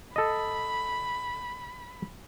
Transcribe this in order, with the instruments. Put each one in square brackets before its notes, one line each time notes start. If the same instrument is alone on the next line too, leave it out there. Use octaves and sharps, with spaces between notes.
[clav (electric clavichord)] A4 D#5 [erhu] B5